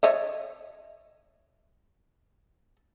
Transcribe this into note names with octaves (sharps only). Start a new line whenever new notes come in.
C#5 D#5 E5